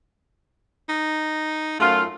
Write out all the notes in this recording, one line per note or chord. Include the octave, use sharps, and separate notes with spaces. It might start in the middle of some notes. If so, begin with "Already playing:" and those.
D#4
F#2 A3 F4